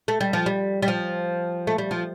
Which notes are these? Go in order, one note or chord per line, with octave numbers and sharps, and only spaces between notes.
A3
G3
F3
G3
G3
F3
A3
G3
F3